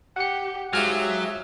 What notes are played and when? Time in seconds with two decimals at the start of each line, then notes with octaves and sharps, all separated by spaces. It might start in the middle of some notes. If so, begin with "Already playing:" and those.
0.16 G4 F#5 C#7
0.73 G#2 F#3 F4 G4 E5 F6